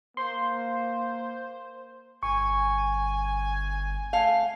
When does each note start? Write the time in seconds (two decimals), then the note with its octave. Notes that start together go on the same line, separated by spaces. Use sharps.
0.17 A#3 C5 C6
2.23 G1 G#5 C#6
4.13 A3 F5